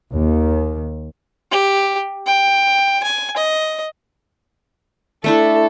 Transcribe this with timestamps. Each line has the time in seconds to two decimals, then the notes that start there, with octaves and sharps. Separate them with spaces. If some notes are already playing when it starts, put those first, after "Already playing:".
0.14 D#2
1.51 G4
2.26 G5
3.03 G#5
3.36 D#5
5.24 A3 D4 E4 A4